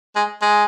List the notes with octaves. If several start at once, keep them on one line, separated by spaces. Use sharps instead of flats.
G#3
G#3